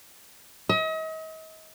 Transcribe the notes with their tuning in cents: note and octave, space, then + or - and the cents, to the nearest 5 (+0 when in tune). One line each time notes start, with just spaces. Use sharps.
D#5 +40